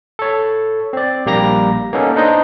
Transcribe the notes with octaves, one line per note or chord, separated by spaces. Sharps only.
A4 C#5
C4 D5
A#1 G3 A#3 G4 A#5 A#6
A#3 B3 C#4 D#4 A4
D4 D#4 C5 D#5